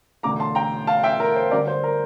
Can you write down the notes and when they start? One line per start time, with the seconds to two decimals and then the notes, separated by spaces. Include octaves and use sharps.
0.23 E1 D2 D3 A3 A#5 D6
0.40 A5 C6
0.55 G5 A#5
0.87 F5 A5
1.04 E5 G5
1.20 A#4
1.36 C5
1.51 D2 D3 G3 A#4 D5
1.67 C5
1.84 A#4